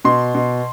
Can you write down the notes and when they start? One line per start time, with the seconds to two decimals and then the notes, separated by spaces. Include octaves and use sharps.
0.05 B2 C6
0.35 B2